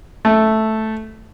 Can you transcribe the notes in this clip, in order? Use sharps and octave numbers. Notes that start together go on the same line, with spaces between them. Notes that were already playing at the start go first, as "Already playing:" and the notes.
A3